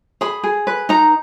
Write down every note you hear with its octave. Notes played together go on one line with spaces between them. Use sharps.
G#4 B5
G#4
B4
D#4 A#5